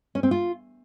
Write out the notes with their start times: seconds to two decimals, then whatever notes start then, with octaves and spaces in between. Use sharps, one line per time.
0.15 C#4
0.23 C4
0.31 F4